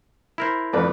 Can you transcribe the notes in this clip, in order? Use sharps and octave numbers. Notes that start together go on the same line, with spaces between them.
E4 A#4 C5
F2 A4 B4 D5